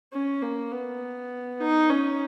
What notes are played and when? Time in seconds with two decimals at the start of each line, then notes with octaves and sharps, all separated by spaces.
0.13 C#4
0.42 A#3
0.72 B3
1.61 D#4
1.90 C#4